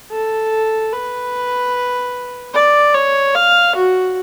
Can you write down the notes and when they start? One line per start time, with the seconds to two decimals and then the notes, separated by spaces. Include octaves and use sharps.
0.12 A4
0.93 B4
2.54 D5
2.95 C#5
3.35 F5
3.75 F#4